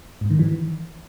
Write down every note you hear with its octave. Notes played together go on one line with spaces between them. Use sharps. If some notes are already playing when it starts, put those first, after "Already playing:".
G#2
D#3
E3